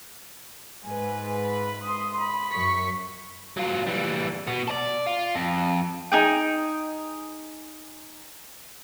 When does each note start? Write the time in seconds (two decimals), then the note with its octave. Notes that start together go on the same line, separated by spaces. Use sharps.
0.84 G#2 B4 G#5
1.45 B5
1.84 C6 D#6
2.20 B5
2.52 F#2 C#6 B6
3.57 F#3 F4
3.87 E3 G3
4.47 B2 B3
4.68 A4 D5
5.07 F4
5.35 F2
6.12 D#4 G#4 G5